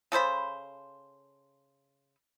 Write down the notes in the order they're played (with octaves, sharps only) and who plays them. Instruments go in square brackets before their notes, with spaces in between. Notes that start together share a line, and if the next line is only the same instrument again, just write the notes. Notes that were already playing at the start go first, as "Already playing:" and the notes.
[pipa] C#3 A4 C5 B5